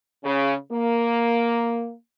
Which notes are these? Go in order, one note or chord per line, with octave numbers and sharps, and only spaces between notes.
C#3
A#3